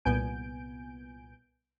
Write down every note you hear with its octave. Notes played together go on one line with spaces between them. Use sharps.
C2 A#2 B3 G#5 G6 D7